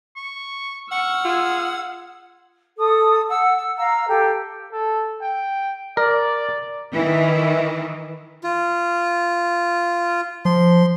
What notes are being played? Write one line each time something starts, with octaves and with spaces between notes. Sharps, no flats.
C#6
F#5 C#6 E6 F6
F4 G#4
A4 D#6
F#5 E6
E6
F5 A#5 E6
G4 A4
A4
G5
A#4 D5
D#3 E3
F4
F3 C6